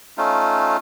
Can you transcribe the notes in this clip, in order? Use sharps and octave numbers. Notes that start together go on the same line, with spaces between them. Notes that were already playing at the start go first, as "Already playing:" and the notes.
A3 C#4 D#4 F4